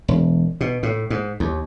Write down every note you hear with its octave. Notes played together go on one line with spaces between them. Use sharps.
E1
B2
A2
G#2
D#2